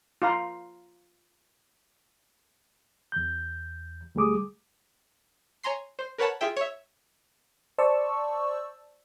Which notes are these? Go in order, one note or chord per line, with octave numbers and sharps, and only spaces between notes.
F4 F5 A#5 C6
E2 G6
D2 G3 A3 G#4 D6 D#6
C#5 G#5 A#5 C6 C7
C5
A#4 B4 C#5 F#5 A5 B5
F4 G#4 E5 G5
C#5 E5
C5 D5 A5 C#6 E6